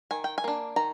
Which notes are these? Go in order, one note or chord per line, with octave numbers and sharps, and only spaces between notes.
D#3 G#5
G5
G#5
A#3 D4
D#3 A#5